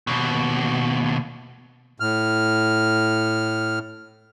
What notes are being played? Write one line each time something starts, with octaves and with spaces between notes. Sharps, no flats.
D#2 B2
A2 F6